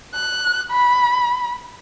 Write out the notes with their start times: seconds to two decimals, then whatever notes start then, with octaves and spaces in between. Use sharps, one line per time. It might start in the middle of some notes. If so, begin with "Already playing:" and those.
0.14 F#6
0.71 B5